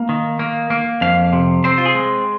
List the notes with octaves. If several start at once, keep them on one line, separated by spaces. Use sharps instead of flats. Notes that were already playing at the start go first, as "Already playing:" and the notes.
Already playing: A#3
D#3
A#3
A#3
F2 F5
C3
C4 C5
F4
G#4
G#3